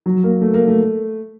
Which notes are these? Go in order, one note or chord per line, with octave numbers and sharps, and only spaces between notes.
F#3
A#3
A3
A#3
A3